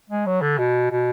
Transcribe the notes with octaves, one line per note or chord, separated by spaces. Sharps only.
G#3
F#3
D3
B2
B2